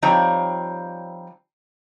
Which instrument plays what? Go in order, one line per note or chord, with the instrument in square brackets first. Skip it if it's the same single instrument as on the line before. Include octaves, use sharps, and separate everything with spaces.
[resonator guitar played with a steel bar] F3 G3 C4 D#4 C#5 D5